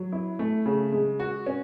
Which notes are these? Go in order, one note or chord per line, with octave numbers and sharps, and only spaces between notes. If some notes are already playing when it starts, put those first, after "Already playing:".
Already playing: F#3
E4
A3
C#3
G#3
F#4
C#4